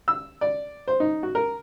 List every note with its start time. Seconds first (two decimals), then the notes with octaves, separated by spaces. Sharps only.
0.08 E6
0.41 D5
0.88 C5
1.00 D#4
1.23 F#4
1.35 A#4